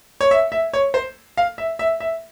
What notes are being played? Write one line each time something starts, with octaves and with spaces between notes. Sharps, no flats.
C#5
E5
E5
C#5
C5
F5
E5
E5
E5